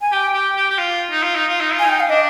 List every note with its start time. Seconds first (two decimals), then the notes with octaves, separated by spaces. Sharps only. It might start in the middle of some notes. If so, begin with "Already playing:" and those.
0.01 G#5
0.12 G4 G5
0.34 G4
0.56 G4
0.70 G4
0.78 F4
1.11 D#4
1.23 F4
1.35 D#4
1.48 F4
1.61 D#4
1.73 F4
1.79 G#5
1.85 D#4 G5
2.00 F5
2.09 D4 D#5